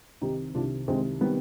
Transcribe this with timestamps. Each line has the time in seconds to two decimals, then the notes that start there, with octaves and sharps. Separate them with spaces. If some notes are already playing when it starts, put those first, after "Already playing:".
0.21 C2 C3 D#3 D#4 G4
0.54 C2 C3 D#3 D4 F4
0.88 C2 C3 D#3 G#3 C4
1.21 C3 D#3 G3 B3